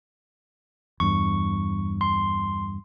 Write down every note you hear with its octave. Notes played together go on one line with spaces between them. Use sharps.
E2 G2 C#6
C6